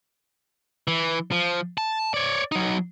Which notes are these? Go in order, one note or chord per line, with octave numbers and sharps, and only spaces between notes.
E3
F3
A5
C#5 D5
F#3 D#4